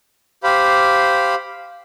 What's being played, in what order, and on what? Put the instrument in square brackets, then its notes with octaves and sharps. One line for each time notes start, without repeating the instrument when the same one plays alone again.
[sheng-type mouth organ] G4 C5 F5 B5